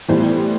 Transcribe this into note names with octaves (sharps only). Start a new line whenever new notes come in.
A2 E3 G3 B3 C5